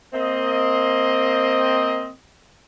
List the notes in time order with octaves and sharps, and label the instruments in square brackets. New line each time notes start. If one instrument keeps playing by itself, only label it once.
[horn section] A#3 C4 D#5